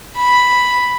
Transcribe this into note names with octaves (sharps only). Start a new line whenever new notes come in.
B5